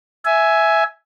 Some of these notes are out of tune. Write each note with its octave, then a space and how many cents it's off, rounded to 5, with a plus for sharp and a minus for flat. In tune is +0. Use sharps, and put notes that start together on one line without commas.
E5 +0 G#5 +10